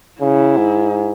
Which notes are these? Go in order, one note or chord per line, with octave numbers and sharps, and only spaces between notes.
C#3 E4
G#2